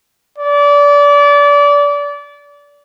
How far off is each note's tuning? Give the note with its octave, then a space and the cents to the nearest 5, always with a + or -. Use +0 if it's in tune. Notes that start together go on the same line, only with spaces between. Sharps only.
D5 -25